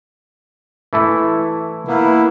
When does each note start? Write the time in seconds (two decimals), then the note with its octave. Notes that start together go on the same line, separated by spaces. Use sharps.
0.93 E3 A3 E4
1.88 A#3 B3 E4